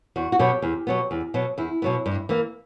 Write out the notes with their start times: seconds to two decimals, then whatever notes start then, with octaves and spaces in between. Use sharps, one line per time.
0.16 E2 F#4
0.32 F#4
0.39 B2 F#3 B3 G4
0.62 E2
0.87 B2 F#3 B3
1.11 E2
1.34 B2 F#3 B3
1.58 E2 E4
1.82 B2 F#3 B3
2.06 G2
2.29 E3 A#3